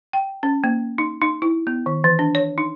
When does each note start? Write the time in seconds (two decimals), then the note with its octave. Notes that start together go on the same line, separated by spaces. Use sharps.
0.13 G5
0.43 C#4
0.64 A#3
0.98 D#4
1.21 D#4
1.42 E4
1.67 B3
1.86 D#3
2.04 E3
2.19 D4
2.35 C#5
2.58 D#4